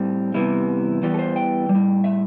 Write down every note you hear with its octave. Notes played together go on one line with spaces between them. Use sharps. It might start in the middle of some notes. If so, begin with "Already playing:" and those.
Already playing: A2 G3 C4
E2 C3 E3 G3 E4
E2 E3 G3
A4
C5
G5
G3
A2
E5